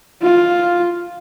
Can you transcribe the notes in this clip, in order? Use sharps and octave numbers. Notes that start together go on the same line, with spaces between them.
F4